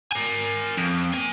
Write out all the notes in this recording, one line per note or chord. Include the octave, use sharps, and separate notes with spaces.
A#4 G#5
F2
A#3 G#5